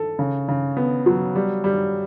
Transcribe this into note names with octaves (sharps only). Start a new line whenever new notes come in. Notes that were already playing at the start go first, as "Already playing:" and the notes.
Already playing: A4
C#3
C#3
B3
F#3
G3
G3